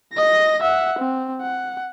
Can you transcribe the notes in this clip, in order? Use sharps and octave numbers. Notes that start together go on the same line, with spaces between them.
D#5 A#6
E5 F#5
C4
F#5